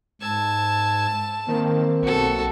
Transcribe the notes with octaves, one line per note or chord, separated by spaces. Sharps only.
G#2 A5 E6 G#6
D#3 A#3 C4
B1 F#4 A4